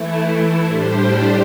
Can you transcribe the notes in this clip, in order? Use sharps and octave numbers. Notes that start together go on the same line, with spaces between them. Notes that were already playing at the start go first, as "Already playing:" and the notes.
Already playing: E3 A3 E4
A2 G3 D4 G4 C5